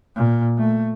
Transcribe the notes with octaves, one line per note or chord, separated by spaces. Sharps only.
A#2
A3